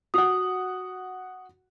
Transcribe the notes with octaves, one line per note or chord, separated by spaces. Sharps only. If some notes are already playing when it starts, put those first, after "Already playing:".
F#4 F#5 D#6